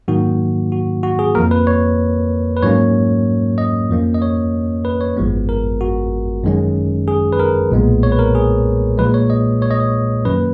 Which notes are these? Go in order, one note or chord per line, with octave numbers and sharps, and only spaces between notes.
G#2 D#3 F#3 A#3 F#4
F#4
F#4
G#4
F2 F3 A#3 A#4
B4
C#5
B4
G#2 F#3 A#3 C#4 C#5
D#5
F2 F3 A#3 C#4
D#5
C#5
B4
C#5
G#1 F#2 F3 G#3 B3
A#4
F#4
F#2 D#3 G#3 C#4
G#4
B4
A#4
B1 A#2 G#3 B3
C#5
B4
A#4
G#4
A#2 F3 G#3 B4
C#5
D#5
C#5
D#5
C#5
F#2 D#3 F#3 A#3 C#4 B4